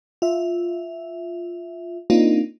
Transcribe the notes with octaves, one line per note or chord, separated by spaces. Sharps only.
F4 E5
A#3 C4 D4 D#4 F4